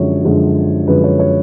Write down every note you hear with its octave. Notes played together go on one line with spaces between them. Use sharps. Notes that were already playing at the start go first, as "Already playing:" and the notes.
Already playing: F#2 D3 F3 G#3 C#5
F#2 D3 F3 G#3
F#2 D3 F3 G#3 B4
C#5
C#5